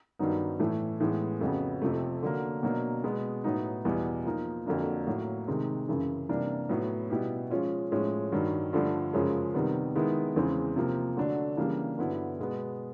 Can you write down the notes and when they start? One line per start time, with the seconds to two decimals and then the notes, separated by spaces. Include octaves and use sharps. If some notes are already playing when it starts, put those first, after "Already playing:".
0.19 G2 D#3 F#3 B3 D#4
0.59 A2 E3 A3
1.00 A2 E3 G#3 B3
1.41 F2 C#3 F#3 B3
1.82 F2 C3 F3 A3
2.23 D3 F#3 A#3
2.63 B2 F#3 A#3 D4
3.04 B2 G#3 B3
3.44 A2 F#3 B3 D#4
3.84 E2 B2 G3 B3 E4
4.25 F3 A#3 D#4
4.66 F2 D3 F#3 A#3 D4
5.07 A2 F#3 A#3
5.48 C3 D#3 G#3
5.88 F#2 C#3 E3
6.29 C3 E3 G3 A#3 D4
6.69 A2 F#3 B3
7.10 B2 G3 B3 E4 G4
7.50 F3 G#3 C#4 F4
7.91 A2 F3 G#3 C#4
8.32 G2 D#3 F#3
8.73 G2 D3 F3 A3 D4
9.13 F#2 C#3 F3 G#3 C#4
9.54 C3 D#3 G3 B3
9.95 D#3 G#3 B3 E4
10.36 E2 C#3 E3 G#3 C4
10.76 C3 F3 A#3
11.17 D3 F#3 A3 D4
11.57 C#3 E3 G3 A#3 D4
11.98 G2 D3 F#3 B3 E4
12.39 B2 G#3 B3